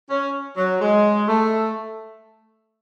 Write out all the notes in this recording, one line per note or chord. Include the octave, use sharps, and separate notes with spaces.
C#4
F#3
G#3
A3